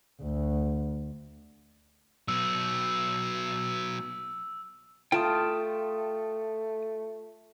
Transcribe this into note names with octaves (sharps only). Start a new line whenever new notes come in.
D2
F#3 B3 E6
A3 F4 G5 A5 D#6